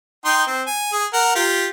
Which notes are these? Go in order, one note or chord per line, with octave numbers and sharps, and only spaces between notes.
D#4 G5 C6
C4
G#5
G#4
A#4 F#5
F4 G4